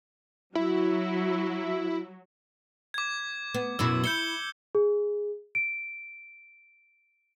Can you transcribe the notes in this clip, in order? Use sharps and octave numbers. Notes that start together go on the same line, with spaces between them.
F#3 E4
D6 G#6
B3
F#2 B2 E4 E6
E4 G6 C#7 G7
G#4
D7